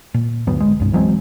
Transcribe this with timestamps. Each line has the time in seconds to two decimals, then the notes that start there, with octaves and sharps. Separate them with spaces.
0.14 A#2
0.47 D2 G2 F#3 B3
0.60 G#1 G#3
0.80 C2 G2
0.93 E3 F#3 G#3 C4